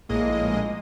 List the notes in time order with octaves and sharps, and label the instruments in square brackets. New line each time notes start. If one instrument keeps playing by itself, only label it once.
[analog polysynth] A#1 A2 G#3 A#3 D#5